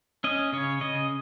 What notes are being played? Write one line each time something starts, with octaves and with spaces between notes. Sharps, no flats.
C#4 D#5
C#3 C#5
C#3 D#5